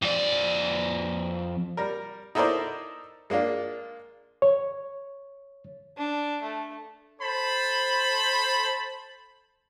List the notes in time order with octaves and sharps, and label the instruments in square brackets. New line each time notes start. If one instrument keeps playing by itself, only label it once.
[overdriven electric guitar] F2 D5
[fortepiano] G3 A#4
D#4 E4 A4 A#4 C5 D5
G#3 A#3 D4 F4
[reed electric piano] C#5
[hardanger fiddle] D4
A3
[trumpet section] A4 C5 A5 B5